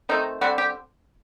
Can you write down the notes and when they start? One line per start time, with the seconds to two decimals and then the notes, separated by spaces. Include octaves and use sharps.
0.09 D#3 A3 C4 D#4
0.41 D3 G3 C4 F#4
0.58 G4